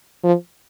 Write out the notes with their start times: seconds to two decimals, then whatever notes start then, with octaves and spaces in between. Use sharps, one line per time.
0.23 F3